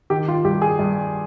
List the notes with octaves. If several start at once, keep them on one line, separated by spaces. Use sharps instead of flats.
D#3 G4
F4
G2 G4
G#4
G2